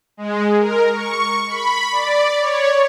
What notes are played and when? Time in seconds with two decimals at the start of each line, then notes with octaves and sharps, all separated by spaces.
0.17 G#3
0.59 A#4
0.92 C#6
1.48 B5
1.92 D5
2.40 C#5